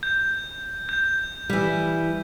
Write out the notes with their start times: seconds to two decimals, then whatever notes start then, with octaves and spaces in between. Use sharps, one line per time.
0.03 G6
0.89 G6
1.49 E3 G3